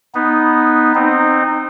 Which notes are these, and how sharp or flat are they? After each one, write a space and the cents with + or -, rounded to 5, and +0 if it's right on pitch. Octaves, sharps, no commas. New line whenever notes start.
B3 +0 D#4 +0
C4 +0 D#4 -20